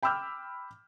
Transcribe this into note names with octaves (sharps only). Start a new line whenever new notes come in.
G5 B5 D6 E6 F6 G6